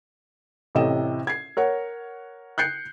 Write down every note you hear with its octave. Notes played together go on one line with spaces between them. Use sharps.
A1 A2 C3 D#5 E7
G#6 C7
A#4 C#5 F#5
F#6 G6 C7 C#7